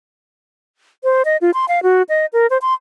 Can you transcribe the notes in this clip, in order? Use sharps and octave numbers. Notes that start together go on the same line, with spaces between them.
C5
D#5
F4
C6
F5
F#4
D#5
A#4
C5
C6